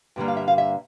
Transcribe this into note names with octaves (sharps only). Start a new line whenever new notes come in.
G2 D3 G3 A#3
F5
E5
F5
E5